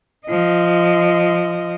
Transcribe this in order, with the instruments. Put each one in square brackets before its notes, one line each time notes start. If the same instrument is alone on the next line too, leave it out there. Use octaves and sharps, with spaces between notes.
[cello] F3 D#5